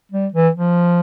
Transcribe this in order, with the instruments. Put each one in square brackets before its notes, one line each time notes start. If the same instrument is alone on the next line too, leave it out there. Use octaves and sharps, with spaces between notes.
[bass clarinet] G3
E3
F3